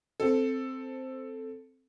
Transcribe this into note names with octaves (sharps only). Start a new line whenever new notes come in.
C4 A4